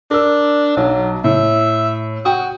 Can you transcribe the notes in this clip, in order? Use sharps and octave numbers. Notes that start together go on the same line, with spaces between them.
D4 A#4 E6
B1 F#3
A2 E5
F#4 F#5 G5 D#6